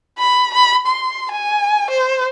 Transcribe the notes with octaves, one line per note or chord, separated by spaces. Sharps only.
B5
B5
C6
G#5
C5